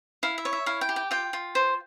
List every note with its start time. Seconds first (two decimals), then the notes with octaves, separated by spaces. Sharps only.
0.23 E4 F5
0.38 E5
0.45 C#5
0.53 E5
0.66 E4 F5
0.81 G5
0.89 G4
0.96 G5
1.11 F4 G5
1.33 F4
1.55 C5